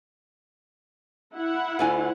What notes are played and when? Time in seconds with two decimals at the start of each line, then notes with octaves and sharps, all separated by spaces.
1.34 E4 F#5
1.79 D2 F4 G#5